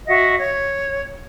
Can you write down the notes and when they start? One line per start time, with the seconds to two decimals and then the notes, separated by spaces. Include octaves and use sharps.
0.06 F#4 D#5 E5 F#5
0.39 C#5